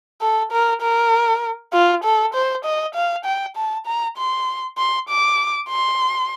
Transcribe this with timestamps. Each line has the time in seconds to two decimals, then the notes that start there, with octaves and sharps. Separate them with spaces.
0.21 A4
0.52 A#4
0.82 A#4
1.73 F4
2.04 A4
2.34 C5
2.65 D#5
2.95 F5
3.25 G5
3.56 A5
3.86 A#5
4.18 C6
4.78 C6
5.09 D6
5.70 C6